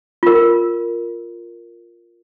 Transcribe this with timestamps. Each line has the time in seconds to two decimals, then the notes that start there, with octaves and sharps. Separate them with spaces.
0.23 F4 A#4